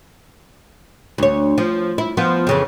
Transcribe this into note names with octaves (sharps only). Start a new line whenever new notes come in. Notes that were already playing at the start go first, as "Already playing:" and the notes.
D2 C#5
F3
E4
F3 B3 F4
F2 C#3 E3